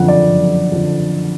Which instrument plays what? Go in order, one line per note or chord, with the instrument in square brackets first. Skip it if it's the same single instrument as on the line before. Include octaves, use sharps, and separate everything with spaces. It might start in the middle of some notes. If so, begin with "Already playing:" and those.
Already playing: [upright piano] F#1 F2 D3 F#5
D5
F#1
F2 D3